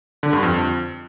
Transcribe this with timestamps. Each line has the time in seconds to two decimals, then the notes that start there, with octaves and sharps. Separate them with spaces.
0.23 D3
0.33 G2
0.43 F2